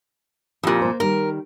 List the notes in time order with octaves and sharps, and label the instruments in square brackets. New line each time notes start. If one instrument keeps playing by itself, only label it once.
[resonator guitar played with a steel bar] F2 A#2 [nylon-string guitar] E4 F4 G4
[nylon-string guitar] A#3 C5
[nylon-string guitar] D#3 G3 [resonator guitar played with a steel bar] A#4